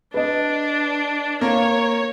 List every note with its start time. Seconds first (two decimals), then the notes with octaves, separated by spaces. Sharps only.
0.14 D4 B4 D#5
1.41 A#3 C#5